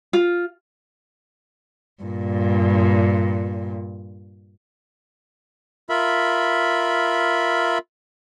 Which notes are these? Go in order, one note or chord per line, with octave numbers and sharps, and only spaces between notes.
F4
G2 A#2
F4 A#4 E5 B5